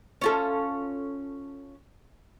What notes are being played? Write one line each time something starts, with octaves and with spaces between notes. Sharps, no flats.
C#4 F4 A4